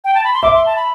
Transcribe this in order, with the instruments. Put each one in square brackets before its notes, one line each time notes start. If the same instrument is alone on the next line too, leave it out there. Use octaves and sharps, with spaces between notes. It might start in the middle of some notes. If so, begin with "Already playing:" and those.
[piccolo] G5
A5
B5
C6
[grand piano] E5 [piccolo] D6
[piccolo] C6
A5
B5